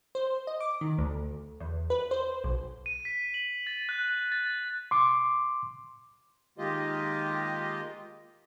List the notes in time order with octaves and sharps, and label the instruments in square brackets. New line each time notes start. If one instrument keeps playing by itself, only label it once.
[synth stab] C5
D#5
D6
D#3
D2
E2
B4
C5
B1
[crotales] D#7
B6
F#7
A6
F#6
A6
[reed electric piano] C6 D6
[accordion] D#3 G#3 A#3 F4 G4 D#5